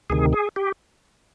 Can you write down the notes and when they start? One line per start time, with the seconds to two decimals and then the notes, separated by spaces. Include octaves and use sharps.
0.10 D2 C3 D#3 G#4
0.33 G#4
0.56 G4